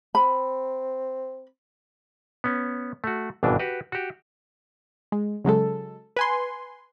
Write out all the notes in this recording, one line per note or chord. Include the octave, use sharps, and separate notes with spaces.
C4 B5
B3 C#4
A3 F#4
G#1 G2 B2 E3 D4
F#4 G4 B4
F#4 G4
G#3
C#3 F#3 G#3 A4
B4 G#5 C6